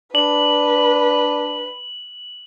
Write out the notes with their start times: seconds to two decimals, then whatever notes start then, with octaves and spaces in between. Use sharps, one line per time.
0.15 D4 B4 F#7